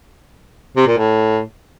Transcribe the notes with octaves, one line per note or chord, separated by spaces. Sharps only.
C3
A#2
A2